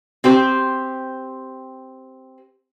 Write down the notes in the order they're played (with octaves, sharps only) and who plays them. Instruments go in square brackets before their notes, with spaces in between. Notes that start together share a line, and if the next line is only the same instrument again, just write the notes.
[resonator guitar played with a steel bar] C4 G4 C5